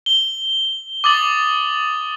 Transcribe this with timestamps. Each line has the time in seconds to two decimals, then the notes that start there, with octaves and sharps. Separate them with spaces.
0.06 G7
1.04 D6 D#6 A6 F#7